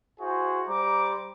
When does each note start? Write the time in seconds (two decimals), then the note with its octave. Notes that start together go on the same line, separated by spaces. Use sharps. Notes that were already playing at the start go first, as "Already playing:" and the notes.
0.21 E4 F#4 G#4 C5
0.68 G3 C5 A#5 D6